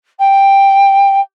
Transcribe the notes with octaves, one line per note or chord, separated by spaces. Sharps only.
G5